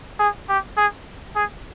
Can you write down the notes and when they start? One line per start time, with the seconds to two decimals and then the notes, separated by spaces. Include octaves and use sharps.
0.19 G#4
0.49 G4
0.77 G#4
1.35 G#4